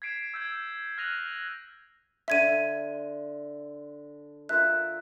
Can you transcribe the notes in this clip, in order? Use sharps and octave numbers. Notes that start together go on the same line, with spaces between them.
G#6 B6 C7 D7 E7
E6 G6 G#6 D7
F6 F#6 A#6 D#7 F7 F#7
D3 E5 C6 G#6 D#7
F4 A#4 E5 F#6